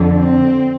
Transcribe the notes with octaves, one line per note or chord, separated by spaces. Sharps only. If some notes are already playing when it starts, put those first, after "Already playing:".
Already playing: F2 D3
C4